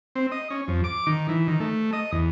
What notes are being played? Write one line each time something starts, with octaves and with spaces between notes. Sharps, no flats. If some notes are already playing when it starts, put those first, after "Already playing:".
C4
D#5
C#4
F2
D6
D#3
E3
D#3
A3
D#5
E2